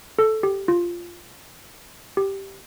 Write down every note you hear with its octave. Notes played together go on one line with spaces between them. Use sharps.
A4
G4
F4
G4